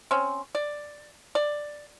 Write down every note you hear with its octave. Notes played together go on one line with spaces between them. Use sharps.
C4 C#4
D5
D5